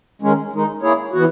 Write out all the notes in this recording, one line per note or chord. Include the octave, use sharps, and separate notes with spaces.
D#3 G#3 C#4
D#3 G#3 D#4
A#3 E4 G#4 C#5
E3 B3 F#4